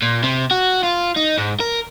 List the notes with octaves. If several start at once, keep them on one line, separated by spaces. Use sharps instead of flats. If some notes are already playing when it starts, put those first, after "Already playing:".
A#2
C3
F#4
F4
D#4
G#2
A#4